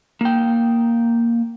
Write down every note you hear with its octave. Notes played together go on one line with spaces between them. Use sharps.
A#3 G5